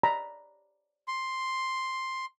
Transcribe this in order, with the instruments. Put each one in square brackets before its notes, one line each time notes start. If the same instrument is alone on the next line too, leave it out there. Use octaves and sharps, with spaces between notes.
[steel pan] D5 A#5 B5
[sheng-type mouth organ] C6